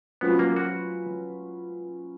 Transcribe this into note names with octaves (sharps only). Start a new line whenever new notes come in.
F#3 B3 C#4 F4 B4
A#3
F#4